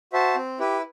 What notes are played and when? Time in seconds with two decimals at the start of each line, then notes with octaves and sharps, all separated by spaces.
0.13 F#4 C5 E5 A5
0.35 C4
0.59 E4 G4 B4